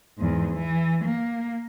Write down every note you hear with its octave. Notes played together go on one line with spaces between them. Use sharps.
E2 G#2
E3
A#3